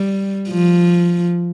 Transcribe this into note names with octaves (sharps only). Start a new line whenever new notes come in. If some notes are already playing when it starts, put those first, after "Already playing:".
Already playing: G3
F3